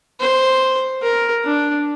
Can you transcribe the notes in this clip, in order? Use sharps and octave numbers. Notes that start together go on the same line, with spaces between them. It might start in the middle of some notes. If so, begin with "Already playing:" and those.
C5
A#4
D4